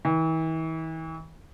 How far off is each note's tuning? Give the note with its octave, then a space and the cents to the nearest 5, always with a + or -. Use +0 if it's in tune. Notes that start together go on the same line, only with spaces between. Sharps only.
E3 -40